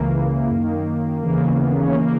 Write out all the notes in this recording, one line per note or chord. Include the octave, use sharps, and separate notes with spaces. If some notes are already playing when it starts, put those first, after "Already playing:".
Already playing: C#2 C#3 E3 A#3
F#2 D#3
D#2 C#3 E3 A#3
B3
C#4
C#3 E3 A#3